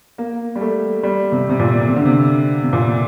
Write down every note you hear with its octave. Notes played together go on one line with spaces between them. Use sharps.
A#3
G3
A3
G3
C3
C3
A#2
C3
D3
C3
C3
A#2